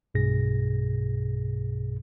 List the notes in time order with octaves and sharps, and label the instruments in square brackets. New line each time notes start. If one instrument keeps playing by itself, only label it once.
[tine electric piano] B1 G2 B2 G#4 A#6